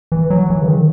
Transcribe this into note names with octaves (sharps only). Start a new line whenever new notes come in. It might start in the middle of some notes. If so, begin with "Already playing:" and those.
E3
F#3
E3
C#3
D#3